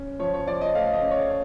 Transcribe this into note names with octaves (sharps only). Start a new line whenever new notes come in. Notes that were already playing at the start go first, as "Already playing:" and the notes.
Already playing: C#4
F3 C#5
C#5
F3 D5
D#5
A3 F5
D#5
C#4
C#5